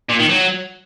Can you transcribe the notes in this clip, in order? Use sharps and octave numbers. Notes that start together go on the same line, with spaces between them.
A#2
D#3
F#3